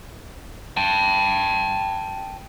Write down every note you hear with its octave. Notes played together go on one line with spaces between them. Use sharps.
G5 A5